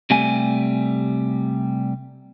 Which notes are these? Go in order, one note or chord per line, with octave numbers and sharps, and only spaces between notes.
C3 G3 A3 G#5